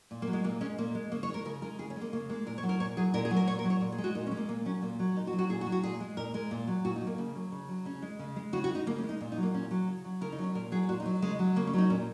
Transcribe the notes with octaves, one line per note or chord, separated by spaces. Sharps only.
A#2
A#3
F#3
G#3
A#2 A#3
G#3 C#4
A#2 A#3
G#3
C#3 A#3
C#5
G#3
A#4
C#3 A#4
G#3 A#4
C#3 G#4
C#4
G#3
A#3
C#3 A#3
G#3 A#3
A#2 A#4
C#5
F#3
A#4
A#2 C#5
F#3 G#4
A#2 A#4
G#4
F#3
A#4
A#2 C#5
A#4
F#3
C#5
A#2
G#4
G#3
F#4
A#2 D#4
C#4
G#3
A#3
A#2 A#3
F#3 C#4
A#2 A#3
F#3
A#2 D#4
F#4
F#3
F#4
A#2 G#4
F#4
F#3
F#4
A#2 G#4
G#3
A#2 A#4
G#3 A#4
A#2
F#3
A#2 F#4
D#4
F#3
A#3
C#3
F#3
C#3
F#3
C#3 C#4
G#3
C#3
G#3
C#3 F#4
F#4
G#3
D#4
C#3 A#3
C#4
G#3
D#4
A#2
D#4
F#3
A#3
A#2 C#4
F#3
C#3
F#3
C#3 A#4
D#4
F#3
C#4
A#2 A#4
F#3 G#4
A#2 F#4
D#4
F#3
C#3 G#3
F#3
C#3 A#3
C#4
F#3 D#4
A#2 C#4